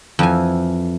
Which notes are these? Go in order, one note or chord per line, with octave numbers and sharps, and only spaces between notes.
F2 E3 G#5